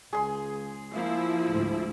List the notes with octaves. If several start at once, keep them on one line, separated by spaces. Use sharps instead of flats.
C#2 G#4 C6
F3 A#3 E4
D2 G#2